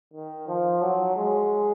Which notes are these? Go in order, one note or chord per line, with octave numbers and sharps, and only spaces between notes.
D#3
F3
F#3
G#3